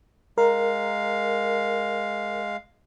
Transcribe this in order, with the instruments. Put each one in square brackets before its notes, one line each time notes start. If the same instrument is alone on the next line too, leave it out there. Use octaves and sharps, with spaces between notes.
[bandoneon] G#3 F5 [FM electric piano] A#4